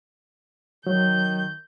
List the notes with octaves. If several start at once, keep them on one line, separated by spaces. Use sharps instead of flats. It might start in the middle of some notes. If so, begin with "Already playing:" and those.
D#3 F#3 G6